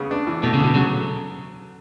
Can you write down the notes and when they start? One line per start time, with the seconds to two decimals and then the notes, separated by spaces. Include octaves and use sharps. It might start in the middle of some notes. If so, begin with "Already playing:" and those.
Already playing: C#3 B3
0.11 D4
0.27 E3
0.43 B2 A3
0.54 C#3
0.59 D3
0.64 B2
0.74 C#3 F#3